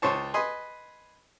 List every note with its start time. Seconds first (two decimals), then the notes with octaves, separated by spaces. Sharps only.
0.02 C#2 C5 C#5 A5
0.34 B4 D#5 G#5 C6